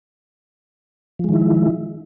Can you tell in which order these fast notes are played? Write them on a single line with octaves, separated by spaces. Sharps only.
F3 G#3 D#3 E4